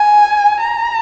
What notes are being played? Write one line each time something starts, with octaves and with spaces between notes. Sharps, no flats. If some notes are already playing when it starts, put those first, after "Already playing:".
Already playing: G#5
A#5